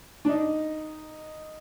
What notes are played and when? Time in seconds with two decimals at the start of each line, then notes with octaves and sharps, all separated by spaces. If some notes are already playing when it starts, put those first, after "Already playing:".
0.25 D4
0.29 D#4